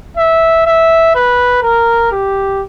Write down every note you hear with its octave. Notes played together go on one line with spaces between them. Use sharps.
E5
E5
B4
A#4
G4